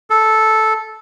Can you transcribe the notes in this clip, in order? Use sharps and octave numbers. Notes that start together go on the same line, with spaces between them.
A4